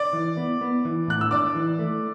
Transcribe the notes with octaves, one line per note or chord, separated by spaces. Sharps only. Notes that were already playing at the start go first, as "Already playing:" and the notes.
Already playing: D5 D6
E3
B3
B3
E3
A2 F#6
E6
D4 D5 D6
E3
A3